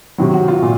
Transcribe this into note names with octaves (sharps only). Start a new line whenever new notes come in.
C3 D#3 F#3
F#4
F4
A#2